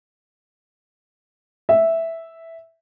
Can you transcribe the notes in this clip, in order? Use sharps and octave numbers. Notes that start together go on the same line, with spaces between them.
E5